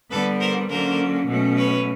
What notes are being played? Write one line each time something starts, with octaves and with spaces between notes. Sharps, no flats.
D3 G3 B3 A4 B4
A#4 C5
D3 F#3 A#3 C#4 A#4 C5
B2 F#3 A3 C#4
B4 C#5